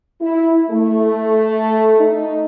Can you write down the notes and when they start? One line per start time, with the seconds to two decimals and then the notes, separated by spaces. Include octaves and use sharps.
0.20 E4
0.70 A3
1.99 D#4